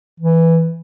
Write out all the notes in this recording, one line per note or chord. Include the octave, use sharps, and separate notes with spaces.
E3